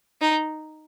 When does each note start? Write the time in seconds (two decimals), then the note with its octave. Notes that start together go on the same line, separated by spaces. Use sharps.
0.21 D#4